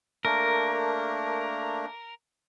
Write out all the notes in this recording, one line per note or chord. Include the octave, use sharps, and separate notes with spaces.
A3 A#3 D4 A#4